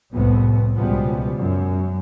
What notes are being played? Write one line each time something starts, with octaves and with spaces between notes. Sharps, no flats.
C2 F2 A2 B3
C#2 B2 F3 G3 B3
F#2